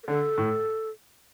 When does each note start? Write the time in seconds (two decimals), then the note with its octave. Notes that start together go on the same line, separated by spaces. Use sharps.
0.03 A#4
0.08 D3 A4
0.38 A2